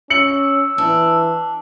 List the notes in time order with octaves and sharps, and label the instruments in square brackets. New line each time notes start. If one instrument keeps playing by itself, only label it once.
[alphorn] C#4 [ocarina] E6 [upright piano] C#7 F#7
[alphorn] E3 [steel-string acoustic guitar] D4